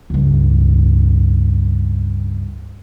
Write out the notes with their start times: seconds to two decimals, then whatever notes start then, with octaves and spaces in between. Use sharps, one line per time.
0.10 C#2 G2